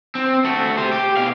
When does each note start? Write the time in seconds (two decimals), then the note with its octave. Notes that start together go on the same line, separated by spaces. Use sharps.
0.15 C4
0.44 A3 F#4
0.78 G4 C5
0.92 G4
1.17 B2 F5